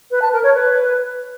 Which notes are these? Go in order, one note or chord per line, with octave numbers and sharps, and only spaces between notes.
B4
A5
A#4
C#5
B4